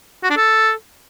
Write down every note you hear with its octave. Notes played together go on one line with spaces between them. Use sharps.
F#4
D4
A4